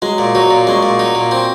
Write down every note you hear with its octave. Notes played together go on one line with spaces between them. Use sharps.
F#3 G#3 F#4
A#2
F#3 D#4 F#4
A#2
G#3 C#4 C#5
A#2
D#4
A#2
C4